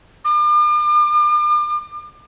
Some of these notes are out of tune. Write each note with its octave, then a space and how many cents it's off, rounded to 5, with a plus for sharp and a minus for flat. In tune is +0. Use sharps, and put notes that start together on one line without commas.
D6 +40